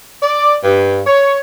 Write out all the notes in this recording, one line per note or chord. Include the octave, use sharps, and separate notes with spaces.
D5
G2
C#5